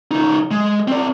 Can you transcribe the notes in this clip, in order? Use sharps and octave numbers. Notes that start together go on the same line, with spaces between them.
C#2 D#4
G#3
C4 D5